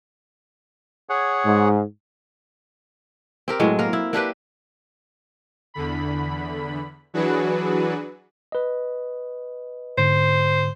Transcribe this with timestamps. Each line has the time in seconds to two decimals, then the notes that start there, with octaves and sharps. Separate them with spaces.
1.09 G#4 C#5 F#5
1.46 G#2
3.48 C4 G4 A#4
3.60 A2 F#3 G#3
3.79 A#3 A#4
3.93 E4
4.13 A#3 D4 G4 B4
5.74 E2 D3 B5
7.14 E3 F#3 D4 F#4 G#4 B4
8.52 B4 D#5
9.98 G#2 D3 C5